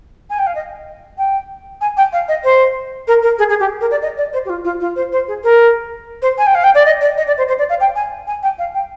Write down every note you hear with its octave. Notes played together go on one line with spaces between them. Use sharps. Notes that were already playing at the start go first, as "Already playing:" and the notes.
G#5
G5
F5
D#5
G5
G#5
G5
F5
D#5
C5
A#4
A#4
G#4
G#4
G4
A#4
D5
D#5
D5
C5
G4
F4
F4
F4
C5
C5
G#4
A#4
C5
G#5
G5
F5
G5
D5
D#5
D5
D#5
D5
C5
C5
D5
F5
G5
G#5
G#5
G5
F5
G5